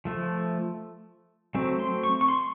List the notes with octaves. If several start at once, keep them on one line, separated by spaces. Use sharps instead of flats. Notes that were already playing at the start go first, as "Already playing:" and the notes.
F3 A3
F#3 A3 C4
C6
C#6
C#6
C6